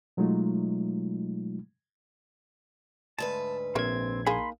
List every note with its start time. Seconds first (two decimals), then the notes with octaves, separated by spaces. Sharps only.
0.17 B2 F#3 G#3 A3 D#4 F4
3.19 D2 G#2 B4 A5
3.75 A#1 C4 A#4 C#5 E5 G#6
4.26 A#3 D#4 G#4 B5 C6